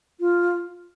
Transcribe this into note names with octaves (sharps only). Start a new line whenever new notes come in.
F4